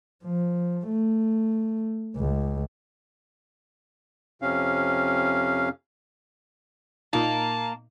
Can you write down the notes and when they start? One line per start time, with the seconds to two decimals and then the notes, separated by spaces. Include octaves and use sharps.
0.25 F3
0.88 A3
2.17 C#2
4.42 F2 C3 C#4 F5
7.13 A#2 A#3 D#4 A5